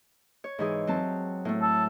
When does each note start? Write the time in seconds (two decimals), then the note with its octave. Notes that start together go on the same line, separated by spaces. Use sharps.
0.44 C#5
0.59 G#2 E3 G#4
0.87 F#3 C4 A5
1.45 A2 A3
1.62 A4